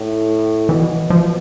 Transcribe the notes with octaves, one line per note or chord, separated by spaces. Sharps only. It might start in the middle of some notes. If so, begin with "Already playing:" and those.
Already playing: A2
B2 E3
F3